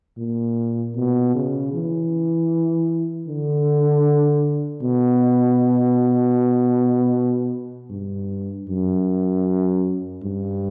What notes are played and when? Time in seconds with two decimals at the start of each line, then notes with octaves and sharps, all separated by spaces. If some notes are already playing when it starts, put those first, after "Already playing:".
0.18 A#2
0.96 B2
1.35 C#3
1.74 E3
3.28 D3
4.83 B2
7.90 G2
8.68 F#2
10.23 G2